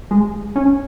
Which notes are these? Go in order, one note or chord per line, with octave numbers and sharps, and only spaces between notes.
G#3
C#4